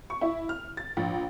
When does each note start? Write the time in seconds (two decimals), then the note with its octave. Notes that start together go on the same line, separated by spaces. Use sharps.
0.10 C#6
0.21 E4
0.49 F6
0.77 A6
0.97 A#1